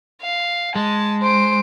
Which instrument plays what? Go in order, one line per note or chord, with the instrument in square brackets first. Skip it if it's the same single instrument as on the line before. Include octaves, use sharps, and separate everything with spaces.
[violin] F5
[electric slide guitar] G#3 [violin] A5
[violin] C5 D7